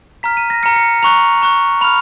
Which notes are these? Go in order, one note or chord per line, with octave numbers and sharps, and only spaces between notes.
A#5 F6 B6
D#7
A#6
A#5 F6 C#7
C#7
A#5 C#6 F#6 F7
A#5 C#6 F#6
B5 F6 F7